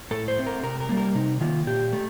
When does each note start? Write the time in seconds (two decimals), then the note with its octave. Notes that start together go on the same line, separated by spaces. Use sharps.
0.11 A2 A4
0.28 C5
0.38 A3 C4
0.46 A#4
0.63 C3 A#4
0.80 A#4
0.89 G3 A#3
0.97 A#4
1.15 C3 D#4
1.41 D#3 A#3 F4
1.67 A#2 G4
1.93 A3